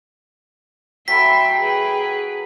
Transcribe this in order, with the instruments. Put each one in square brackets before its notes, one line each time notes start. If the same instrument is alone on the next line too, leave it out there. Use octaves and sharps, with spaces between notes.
[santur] F#3 A3 B5 [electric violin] E5 C6 [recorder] G5 [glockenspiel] B6
[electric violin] G#4 B4